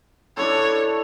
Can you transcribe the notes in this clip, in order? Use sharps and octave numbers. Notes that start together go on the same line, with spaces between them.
D4 E4 A4 C#5